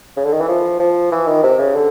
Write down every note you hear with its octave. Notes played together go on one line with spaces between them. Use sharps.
C#3
D3
D#3
E3
F3
F3
E3
D#3
C3
C#3
D3